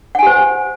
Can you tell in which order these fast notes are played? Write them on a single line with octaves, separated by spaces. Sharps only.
F#5 G#5 G4 C5